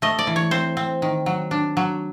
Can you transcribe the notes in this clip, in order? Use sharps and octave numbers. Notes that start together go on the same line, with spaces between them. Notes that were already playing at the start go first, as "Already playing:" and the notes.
A3 D#5
D5
E3
C#5
C4 C5
C4
D#3
F#3
D4
F#3